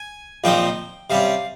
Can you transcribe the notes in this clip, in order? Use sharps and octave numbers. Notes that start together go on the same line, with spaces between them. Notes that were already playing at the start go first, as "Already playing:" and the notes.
Already playing: G#5
A#1 A#2 F3 C4 D#4 G5
C3 G3 C#4 F5